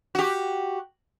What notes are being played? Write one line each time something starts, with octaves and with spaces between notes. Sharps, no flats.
F#4 G4